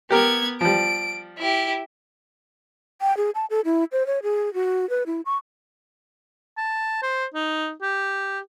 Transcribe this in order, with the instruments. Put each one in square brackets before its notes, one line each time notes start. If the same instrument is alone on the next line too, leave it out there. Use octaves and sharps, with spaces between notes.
[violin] B3 G#6 [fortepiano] G4 A#4
[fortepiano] F3 G3 [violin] D7
[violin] E4 G4
[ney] G5
G#4
A5
A4
E4
C5
C#5
G#4
F#4
B4
E4
C#6
[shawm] A5
C5
D#4
G4